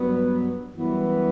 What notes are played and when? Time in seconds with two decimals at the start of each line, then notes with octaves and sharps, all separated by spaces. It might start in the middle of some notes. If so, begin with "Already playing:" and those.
Already playing: G2 F#3 B3
0.73 F#2 E3 G3 B3